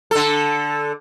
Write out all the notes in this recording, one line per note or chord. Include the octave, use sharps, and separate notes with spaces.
D3 A4